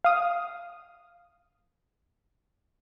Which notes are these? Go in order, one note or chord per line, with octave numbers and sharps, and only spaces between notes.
F5 D#6